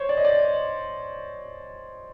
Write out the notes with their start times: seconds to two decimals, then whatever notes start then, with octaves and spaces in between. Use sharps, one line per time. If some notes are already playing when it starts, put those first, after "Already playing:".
Already playing: C5 C#5
0.09 D5
0.17 D#5
0.25 D5